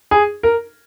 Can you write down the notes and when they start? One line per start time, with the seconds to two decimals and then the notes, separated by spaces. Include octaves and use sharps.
0.11 G#4
0.43 A#4